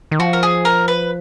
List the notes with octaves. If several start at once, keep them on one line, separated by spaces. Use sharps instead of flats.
D#3
F3 F#4
A#4
G#4
A#4
B4